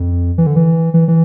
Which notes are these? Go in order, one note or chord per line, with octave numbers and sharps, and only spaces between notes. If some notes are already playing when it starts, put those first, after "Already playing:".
Already playing: F2
E3
D3
E3
E3
E3